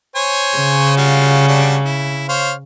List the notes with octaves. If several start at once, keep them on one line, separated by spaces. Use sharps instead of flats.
C5 C#5 G#5
C#3
G3 F4 F#4
G3 D4 F#4
E4
C5 C#5 F5